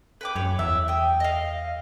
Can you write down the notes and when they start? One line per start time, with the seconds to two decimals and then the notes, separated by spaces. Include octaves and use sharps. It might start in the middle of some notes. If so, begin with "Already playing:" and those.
0.21 B4 G5 D6
0.36 F#2 C#5
0.59 E2 E5
0.88 G5 D#6
1.20 D#5 F5